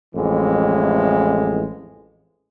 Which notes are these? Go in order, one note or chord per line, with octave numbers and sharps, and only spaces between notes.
A1 F2 E3 G#3